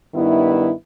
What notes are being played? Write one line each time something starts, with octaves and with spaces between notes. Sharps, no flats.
G2 D#3 G3 B3 E4